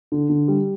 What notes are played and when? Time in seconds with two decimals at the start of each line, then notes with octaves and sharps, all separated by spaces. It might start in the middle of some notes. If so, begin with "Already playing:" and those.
0.12 D3
0.30 D3
0.48 G3